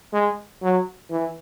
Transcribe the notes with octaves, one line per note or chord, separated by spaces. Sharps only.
G#3
F#3
E3